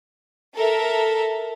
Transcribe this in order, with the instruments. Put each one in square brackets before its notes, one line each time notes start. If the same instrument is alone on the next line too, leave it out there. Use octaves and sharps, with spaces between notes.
[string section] A4 A#4 E5